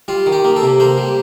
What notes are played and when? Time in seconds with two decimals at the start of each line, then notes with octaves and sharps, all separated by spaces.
0.08 G3 F4
0.26 D#3
0.32 G4
0.45 A#3
0.56 A4
0.62 C3
0.80 A#3 C5
0.98 G3